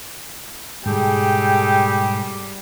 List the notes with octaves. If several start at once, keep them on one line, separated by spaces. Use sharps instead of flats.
G#2 B2 D3 G3 G#4 A4 G5